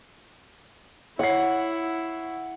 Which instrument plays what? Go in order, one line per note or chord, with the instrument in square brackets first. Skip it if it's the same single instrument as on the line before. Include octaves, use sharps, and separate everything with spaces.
[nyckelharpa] E4 [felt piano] C#5 C7 [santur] F#5